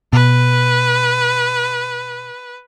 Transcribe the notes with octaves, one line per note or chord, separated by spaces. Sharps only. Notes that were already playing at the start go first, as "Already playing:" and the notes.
B2 B4